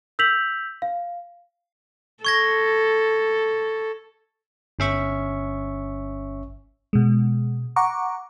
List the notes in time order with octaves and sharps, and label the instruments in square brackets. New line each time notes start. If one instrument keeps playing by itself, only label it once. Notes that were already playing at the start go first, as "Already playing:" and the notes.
[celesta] E6 G6 B6 F7 F#7
F5
[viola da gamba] A4 [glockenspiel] C#6 G#6 A#6
[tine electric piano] G1 C#4 E5 C#6
[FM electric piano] B2 G#3
F#5 A#5 C#6 D6